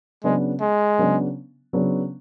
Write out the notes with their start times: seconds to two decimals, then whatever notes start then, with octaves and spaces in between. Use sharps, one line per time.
0.24 C#3 F#3 G#3 B3 D4
0.61 G#3
0.98 C#3 F#3 B3 D4
1.73 C#3 F#3 B3 D4